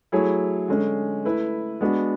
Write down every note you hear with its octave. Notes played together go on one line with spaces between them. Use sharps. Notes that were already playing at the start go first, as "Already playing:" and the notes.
F#3 A3 E4 G#4 C#5
D3 G#3 C#4
A3 E4 B4
G#3 B3 D4 F#4